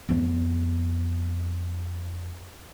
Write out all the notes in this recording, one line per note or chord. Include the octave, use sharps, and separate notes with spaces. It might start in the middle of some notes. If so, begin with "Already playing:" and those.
F2 B3